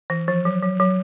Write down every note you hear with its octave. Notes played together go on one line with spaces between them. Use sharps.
E3
F3
F#3
F#3
F#3